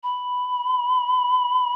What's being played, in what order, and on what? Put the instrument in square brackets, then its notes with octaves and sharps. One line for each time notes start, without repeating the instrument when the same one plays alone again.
[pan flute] B5